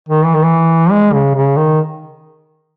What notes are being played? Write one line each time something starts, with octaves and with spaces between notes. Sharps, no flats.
D#3
E3
D#3
E3
G#3
C#3
C#3
D#3